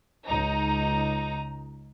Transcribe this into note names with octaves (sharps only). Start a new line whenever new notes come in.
C#2 D#4 A#5